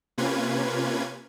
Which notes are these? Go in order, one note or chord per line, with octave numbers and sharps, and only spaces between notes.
C3 A#3 C#4 F4 B4 G#6